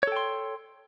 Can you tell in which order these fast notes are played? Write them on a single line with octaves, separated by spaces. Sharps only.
C#5 A4 G5 C6